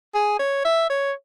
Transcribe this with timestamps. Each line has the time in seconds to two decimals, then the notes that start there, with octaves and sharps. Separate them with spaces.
0.15 G#4
0.39 C#5
0.65 E5
0.90 C#5